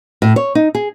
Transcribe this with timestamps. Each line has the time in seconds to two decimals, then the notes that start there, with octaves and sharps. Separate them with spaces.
0.22 A2
0.36 C#5
0.55 D#4
0.75 G#4